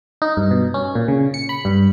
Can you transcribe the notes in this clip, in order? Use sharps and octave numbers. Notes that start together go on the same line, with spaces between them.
D#4
G2
B2
C#4
A#2
C#3
C#7
B5
G2